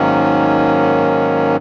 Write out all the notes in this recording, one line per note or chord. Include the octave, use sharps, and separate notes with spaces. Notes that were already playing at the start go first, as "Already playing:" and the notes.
Already playing: G#2 D#3 F#3 A#3 C#4